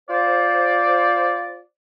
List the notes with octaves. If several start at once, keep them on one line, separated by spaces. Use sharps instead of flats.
F4 C5 D5